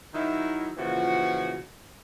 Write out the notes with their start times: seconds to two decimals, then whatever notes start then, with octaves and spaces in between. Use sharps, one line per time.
0.13 D#3 F#3 D#4 E4
0.76 A#2 C#3 E3 F3 F#4